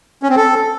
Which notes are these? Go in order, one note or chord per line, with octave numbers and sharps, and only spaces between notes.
C#4
C4
A4